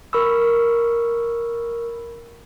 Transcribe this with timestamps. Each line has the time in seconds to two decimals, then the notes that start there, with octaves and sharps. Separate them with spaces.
0.13 A#4 B5 C#6 E6